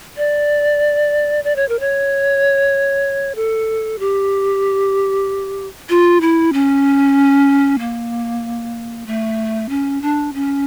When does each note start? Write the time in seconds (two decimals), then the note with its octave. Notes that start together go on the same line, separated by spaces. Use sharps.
0.17 D5
1.44 D5
1.56 C#5
1.69 A#4
1.80 C#5
3.35 A4
3.99 G4
5.90 F4
6.21 E4
6.53 C#4
7.79 A#3
9.06 A3
9.69 C#4
10.02 D4
10.34 C#4